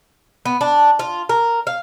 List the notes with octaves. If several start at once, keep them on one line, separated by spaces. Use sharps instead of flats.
B3
D4
F4
A#4
F5